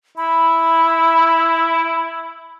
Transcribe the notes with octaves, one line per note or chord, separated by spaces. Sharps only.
E4 B5